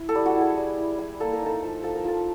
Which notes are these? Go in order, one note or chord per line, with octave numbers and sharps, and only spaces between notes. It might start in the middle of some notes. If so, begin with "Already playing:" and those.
Already playing: E4
A4
G3
F#4
E4
G#4
G3
E4
G3
A#3 A4
A#4
D#4 A4
F3
F3 A4
A#4
F3 A4